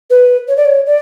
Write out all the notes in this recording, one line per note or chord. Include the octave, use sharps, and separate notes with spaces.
B4
C#5
D5
C#5
D5